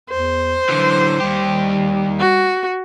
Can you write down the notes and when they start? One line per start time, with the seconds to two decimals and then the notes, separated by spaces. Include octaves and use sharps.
0.10 E2 C5
0.69 D3 E3 F#3
1.20 D#2 G3 G4
2.20 F#4